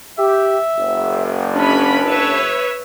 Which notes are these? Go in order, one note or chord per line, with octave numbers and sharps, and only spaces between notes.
G4 E5
F#1
C#4 D4 B5
B4 C#5 E5